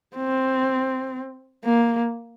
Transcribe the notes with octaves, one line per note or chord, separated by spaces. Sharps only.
C4
A#3